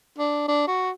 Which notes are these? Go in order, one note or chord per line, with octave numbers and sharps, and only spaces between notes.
D4
D4
F#4